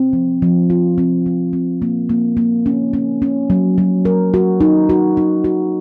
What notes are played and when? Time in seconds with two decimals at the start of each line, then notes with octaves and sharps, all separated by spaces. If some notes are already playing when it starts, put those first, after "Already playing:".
Already playing: C4
0.13 F3
0.42 F3
0.70 F4
0.98 C4
1.26 F3
1.53 C4
1.82 A#3
2.09 A#3
2.37 A#3
2.66 C#4
2.93 C#4
3.22 C#4
3.50 F#3
3.78 F#3
4.05 A#4
4.34 F#4
4.61 D#4
4.89 F#4
5.17 D#4
5.44 F#4